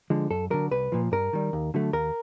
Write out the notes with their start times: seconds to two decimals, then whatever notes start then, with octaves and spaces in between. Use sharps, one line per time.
0.10 D3 F3 G#3
0.30 F#2 A4
0.50 D3 F#3 A#4
0.71 C2 B4
0.92 A#2 F3
1.12 G2 A#4
1.33 D#3 G3
1.53 D#2
1.74 D3 F#3 A3
1.93 D#2 A#4